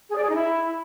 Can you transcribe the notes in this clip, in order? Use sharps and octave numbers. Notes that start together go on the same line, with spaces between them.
G#4
D5
G#4
D#4
E4